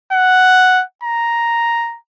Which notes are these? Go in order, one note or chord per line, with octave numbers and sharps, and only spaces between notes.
F#5
A#5